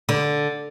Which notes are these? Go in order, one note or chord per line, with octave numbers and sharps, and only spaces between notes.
D3